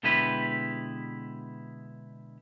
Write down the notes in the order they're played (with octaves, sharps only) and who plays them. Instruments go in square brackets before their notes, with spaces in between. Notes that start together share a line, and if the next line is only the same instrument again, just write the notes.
[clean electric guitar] B2 D3 G#3 E4 G4 B4